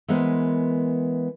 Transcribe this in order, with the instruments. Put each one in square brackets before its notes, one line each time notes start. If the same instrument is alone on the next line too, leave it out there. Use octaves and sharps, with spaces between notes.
[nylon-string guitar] E3 G#3 B3 A#4 C5